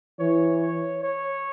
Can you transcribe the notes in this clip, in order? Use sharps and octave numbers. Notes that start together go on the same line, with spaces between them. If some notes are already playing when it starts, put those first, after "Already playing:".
E3 C#5
C#5
C#5